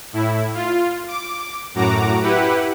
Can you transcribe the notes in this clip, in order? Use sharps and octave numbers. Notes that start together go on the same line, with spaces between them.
A2 E4
F4
D6
F#2 A2 F#4 A#5 D6
E4 G4 B4 F#5